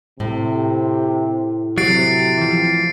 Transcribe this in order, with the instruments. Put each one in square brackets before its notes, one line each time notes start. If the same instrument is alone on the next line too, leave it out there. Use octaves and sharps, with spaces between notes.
[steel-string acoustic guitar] A2 [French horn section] C3
[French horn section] C3 [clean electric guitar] F#3 [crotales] A6 C7 D7
[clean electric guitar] E3 F3